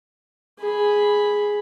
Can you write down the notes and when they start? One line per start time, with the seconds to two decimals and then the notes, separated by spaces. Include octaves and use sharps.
0.60 G#4 B5